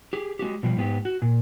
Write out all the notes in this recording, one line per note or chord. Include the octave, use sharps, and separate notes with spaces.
G4 G#4
G#3 A#3 F#4 G4
B2 F3 G3
G#2 B3 G4
F#4
A#2